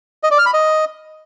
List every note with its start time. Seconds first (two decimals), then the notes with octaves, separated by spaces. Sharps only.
0.23 D#5
0.31 D5
0.38 F6
0.46 B5
0.54 D#5